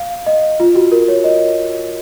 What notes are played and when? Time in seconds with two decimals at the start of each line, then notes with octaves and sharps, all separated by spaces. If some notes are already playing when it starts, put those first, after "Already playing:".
Already playing: F5
0.26 D#5
0.60 F4
0.75 F#4
0.92 A#4
1.08 C#5
1.24 D#5